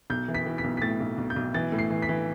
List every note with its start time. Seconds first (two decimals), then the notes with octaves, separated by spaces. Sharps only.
0.10 B1 G6
0.28 E3
0.35 B6
0.46 E3
0.58 B6
0.64 B1
0.77 B6
0.82 A2 A6
1.00 B1
1.18 B1
1.30 G6
1.36 B1
1.54 E3 A6
1.72 A2
1.79 C7
1.90 E3
2.02 B6
2.09 E3